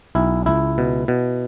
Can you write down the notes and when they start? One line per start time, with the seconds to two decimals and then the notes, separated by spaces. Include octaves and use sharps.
0.15 B1 E4
0.46 C#2 E4
0.78 B2
1.08 B2